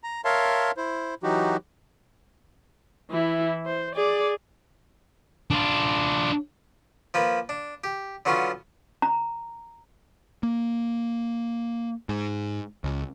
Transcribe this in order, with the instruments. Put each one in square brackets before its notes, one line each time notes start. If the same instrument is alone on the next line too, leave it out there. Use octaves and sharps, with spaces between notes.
[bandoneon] A#5
A#4 C#5 E5 F5 A5 C6
E4 C5
E3 F#3 D#4 F#4 G4
[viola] E3 E4
C5
G#4 D5
[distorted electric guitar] D4 F4
[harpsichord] F3 A#3 B4
D4
G4
D3 F#3 B3 C#4 F4
[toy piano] A#5
[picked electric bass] A#3
G#2
C#2